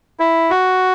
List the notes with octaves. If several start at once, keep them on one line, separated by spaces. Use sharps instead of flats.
E4
F#4